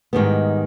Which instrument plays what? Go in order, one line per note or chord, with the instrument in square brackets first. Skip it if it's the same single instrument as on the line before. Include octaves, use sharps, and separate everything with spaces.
[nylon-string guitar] G#2 D#3 G3 B3